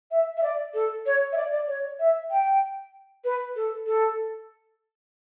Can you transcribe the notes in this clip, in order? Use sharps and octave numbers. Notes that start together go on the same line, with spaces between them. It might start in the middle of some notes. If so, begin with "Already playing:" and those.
E5
E5
D5
A4
C#5
E5
D5
D5
C#5
E5
G5
B4
A4
A4